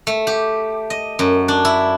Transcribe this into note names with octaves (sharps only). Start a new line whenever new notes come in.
A3
G4
D#5
F#2
D4
E4